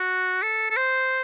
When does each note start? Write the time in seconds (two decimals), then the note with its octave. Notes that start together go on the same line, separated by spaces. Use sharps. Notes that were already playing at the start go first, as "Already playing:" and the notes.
Already playing: F#4
0.43 A4
0.70 A4
0.77 C5